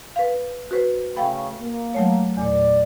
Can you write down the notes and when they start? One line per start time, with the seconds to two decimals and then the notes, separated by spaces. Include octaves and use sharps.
0.16 B4 F5
0.71 F#4 B4 C5
1.16 C#3 A3 F5 G5 B5
1.60 A#3
1.94 F#3 A3 C#5
2.37 E2 A#2 D5